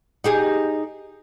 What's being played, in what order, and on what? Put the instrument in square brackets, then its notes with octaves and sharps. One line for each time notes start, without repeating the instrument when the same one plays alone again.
[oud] D#4 G4 G#4